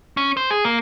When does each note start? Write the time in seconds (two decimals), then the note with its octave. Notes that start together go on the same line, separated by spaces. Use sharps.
0.17 C#4
0.37 C5
0.51 G#4
0.65 A#3